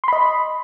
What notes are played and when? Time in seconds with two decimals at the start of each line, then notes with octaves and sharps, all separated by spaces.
0.04 C6
0.08 B5
0.13 D#5